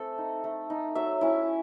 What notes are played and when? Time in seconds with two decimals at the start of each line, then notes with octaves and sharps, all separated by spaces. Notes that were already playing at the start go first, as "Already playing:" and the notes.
Already playing: A3 C4 A4
0.18 D#4
0.44 A3
0.70 D#4
0.95 F#3 E5
1.21 C#4 E4